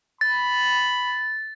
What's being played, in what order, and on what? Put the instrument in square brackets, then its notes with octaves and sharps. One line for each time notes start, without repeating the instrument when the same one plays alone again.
[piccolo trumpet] B5 [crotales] A6